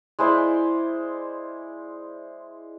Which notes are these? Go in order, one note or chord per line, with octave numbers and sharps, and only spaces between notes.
G#3 E4 C5 D5